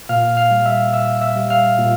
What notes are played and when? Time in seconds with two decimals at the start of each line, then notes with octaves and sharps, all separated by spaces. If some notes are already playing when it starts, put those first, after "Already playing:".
0.09 A#2 F5 F6
0.37 F5 F6
0.51 G3
0.66 E5 E6
0.93 A#2 E5 E6
1.21 E5 E6
1.36 G3
1.50 F5 F6
1.78 A#2